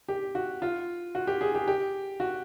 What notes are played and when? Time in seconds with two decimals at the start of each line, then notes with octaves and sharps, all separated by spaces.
0.09 G4
0.35 F#4
0.62 F4
1.15 F#4
1.27 G4
1.41 G#4
1.55 G4
1.68 G4
2.20 F#4